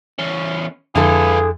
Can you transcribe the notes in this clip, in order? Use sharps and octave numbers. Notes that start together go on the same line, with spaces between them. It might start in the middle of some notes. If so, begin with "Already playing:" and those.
E2 C#4
F2 D3 E4 F4 G#4 A4 B4